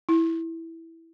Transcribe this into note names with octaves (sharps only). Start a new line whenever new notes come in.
E4